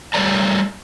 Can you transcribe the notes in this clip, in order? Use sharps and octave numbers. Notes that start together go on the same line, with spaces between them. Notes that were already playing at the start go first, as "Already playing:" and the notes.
G3 A3 B4 C#5 D5 A#5